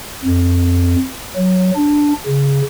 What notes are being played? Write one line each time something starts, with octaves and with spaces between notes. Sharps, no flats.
F2
F#3
D4
C#3